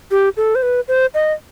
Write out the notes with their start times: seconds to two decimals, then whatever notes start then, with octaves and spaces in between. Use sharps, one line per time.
0.11 G4
0.37 A4
0.55 C5
0.63 B4
0.88 C5
1.14 D#5